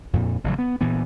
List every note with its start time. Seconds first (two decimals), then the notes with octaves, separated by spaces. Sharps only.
0.13 F2 A#2
0.44 A1 C#3 F#3
0.59 B3
0.81 A#2 E3 B3